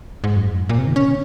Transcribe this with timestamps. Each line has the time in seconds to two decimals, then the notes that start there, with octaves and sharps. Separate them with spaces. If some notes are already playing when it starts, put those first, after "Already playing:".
0.24 G#2
0.36 F#2
0.48 F2
0.60 F#2
0.69 A#2
0.78 C3
0.87 D#3
0.96 C#4